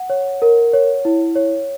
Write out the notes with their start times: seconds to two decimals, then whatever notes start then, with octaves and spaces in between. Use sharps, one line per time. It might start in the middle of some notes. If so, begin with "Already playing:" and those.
Already playing: F#5
0.10 C#5
0.42 A#4
0.73 C#5
1.05 E4
1.35 C#5